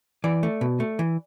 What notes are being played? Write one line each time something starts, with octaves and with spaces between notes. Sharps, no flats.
E3 D5
A3
B2
A3
E3